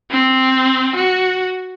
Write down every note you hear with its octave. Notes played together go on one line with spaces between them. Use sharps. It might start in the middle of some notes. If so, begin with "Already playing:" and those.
C4
F#4